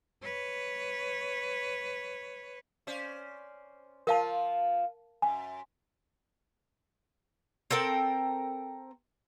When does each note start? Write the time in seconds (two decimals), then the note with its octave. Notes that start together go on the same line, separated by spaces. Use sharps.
0.23 B4 C#5
2.87 C#4 C5 D5
4.07 F3 F4 A#4 F5 A5
5.22 F#2 G#5
7.71 C4 A4 A#4 G5